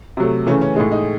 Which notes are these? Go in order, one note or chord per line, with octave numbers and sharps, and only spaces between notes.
C3 F#3 A3
C#3 E3 A3 C#4
C#4
A2 G#3 D#4
D#4